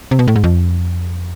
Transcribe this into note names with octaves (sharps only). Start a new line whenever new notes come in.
C3
B2
A2
G#2
F2